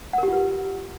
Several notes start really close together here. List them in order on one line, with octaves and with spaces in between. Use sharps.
F#5 A#4 G4 F4 B4